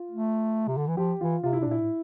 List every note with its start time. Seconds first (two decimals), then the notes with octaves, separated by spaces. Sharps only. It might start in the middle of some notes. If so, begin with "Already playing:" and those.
Already playing: F4
0.11 A3
0.68 C3
0.77 D3
0.88 E3
0.97 F3 G4
1.21 E3 F4
1.43 C3 F4
1.53 E4
1.60 C3
1.62 D4
1.67 A#2 E4
1.81 A2